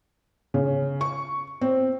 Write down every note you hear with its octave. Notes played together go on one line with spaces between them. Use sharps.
C#3
C#6
C4